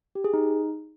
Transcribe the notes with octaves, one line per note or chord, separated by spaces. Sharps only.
G4
G#4
D#4